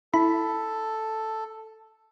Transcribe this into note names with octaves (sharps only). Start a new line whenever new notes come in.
E4 A4 B5